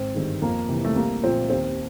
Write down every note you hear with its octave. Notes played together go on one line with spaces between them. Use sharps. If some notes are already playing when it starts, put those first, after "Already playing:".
Already playing: G#1 C4
G2 D#3 G#3
F2 A#3
C3 E3
A3
C2 A#3
A#2 F3 C4
D#2 C4